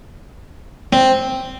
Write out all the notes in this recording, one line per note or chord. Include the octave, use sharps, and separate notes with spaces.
C4